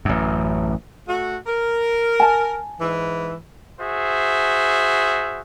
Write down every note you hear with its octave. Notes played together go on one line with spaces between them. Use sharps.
A1 F#2
A3 F#4
A#4
G#5 A5
G#2 E3
F#4 G#4 C5 E5